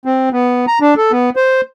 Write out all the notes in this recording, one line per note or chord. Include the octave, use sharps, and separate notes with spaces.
C4
B3
A#5
D4
A4
B3
C5